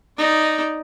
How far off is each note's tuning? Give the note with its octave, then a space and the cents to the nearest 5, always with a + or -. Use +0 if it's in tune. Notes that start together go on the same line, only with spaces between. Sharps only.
D#4 +0 D5 +0